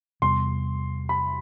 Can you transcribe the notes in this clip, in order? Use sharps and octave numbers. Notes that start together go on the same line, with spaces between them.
E2 C3 G3 B3 C6
B5